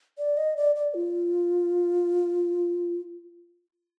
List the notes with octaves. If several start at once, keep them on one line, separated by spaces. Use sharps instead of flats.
D5
D#5
D5
D5
F4